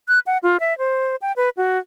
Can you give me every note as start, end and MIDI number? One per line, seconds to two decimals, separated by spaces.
0.08 0.19 90
0.27 0.38 78
0.43 0.57 65
0.60 0.77 76
0.78 1.16 72
1.22 1.32 79
1.36 1.49 71
1.57 1.78 66